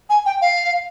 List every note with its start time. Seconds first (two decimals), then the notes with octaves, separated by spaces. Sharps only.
0.10 G#5
0.26 G5
0.42 F5